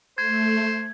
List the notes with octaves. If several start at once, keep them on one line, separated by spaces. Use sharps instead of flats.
A3 C5 G#6